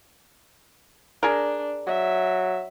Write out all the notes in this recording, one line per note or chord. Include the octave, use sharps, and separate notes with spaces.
D4 G#4 A#4
F#3 E5